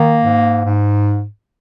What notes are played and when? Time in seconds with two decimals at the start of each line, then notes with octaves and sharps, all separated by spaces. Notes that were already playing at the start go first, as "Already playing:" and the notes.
Already playing: D#3 A#3
0.22 G#2
0.64 G#2